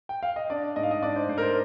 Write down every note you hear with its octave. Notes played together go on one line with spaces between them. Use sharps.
G5
F5
D#5
D4 D5
G#2 D#5
F5
D#5
D4 D5
C5
G#2 C5
A#4
C5